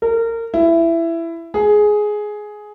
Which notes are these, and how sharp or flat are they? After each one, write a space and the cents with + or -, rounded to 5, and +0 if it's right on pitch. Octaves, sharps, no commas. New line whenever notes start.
A#4 -25
E4 +15
G#4 +10